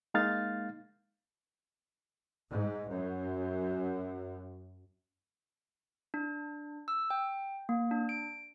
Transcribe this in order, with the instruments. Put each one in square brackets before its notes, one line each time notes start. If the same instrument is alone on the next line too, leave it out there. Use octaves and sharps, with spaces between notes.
[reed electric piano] G#3 A#3 D#4 F5 F6 A6
[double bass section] G#2
F#2
[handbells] D4
E6
G5
A#3
D4
D7